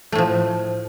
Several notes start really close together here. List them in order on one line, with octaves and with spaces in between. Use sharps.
A3 A2 F3